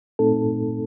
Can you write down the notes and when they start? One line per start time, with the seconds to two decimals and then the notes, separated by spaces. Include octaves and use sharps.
0.19 A#2 A3 C4 D#4 A4